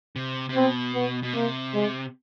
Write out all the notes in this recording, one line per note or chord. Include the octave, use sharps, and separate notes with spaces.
C3
C3
B2 C4
B3
B2
C3 A#3
G#3